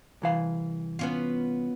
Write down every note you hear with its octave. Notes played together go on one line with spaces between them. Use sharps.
C2 E3 F5
B3 C#4 F4